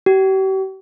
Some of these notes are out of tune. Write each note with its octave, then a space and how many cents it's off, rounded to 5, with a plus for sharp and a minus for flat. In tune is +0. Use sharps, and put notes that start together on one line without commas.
G4 -40